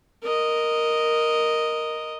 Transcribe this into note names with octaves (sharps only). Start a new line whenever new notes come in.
A#4 D#5